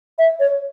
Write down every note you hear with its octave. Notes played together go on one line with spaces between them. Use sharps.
E5
C#5